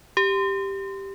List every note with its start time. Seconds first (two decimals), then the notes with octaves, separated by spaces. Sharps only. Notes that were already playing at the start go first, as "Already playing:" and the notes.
0.17 G4